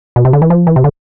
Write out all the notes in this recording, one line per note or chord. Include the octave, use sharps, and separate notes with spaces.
B2
C3
D3
E3
F3
E3
C3
D3